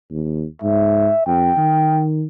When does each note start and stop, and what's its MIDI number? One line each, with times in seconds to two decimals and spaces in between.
0.10 0.44 39
0.62 1.09 44
0.62 1.24 76
1.26 1.51 41
1.26 2.03 79
1.57 2.26 51